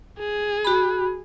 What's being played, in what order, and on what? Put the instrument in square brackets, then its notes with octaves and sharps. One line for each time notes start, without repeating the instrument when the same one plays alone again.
[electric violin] G#4
[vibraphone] F#4 B5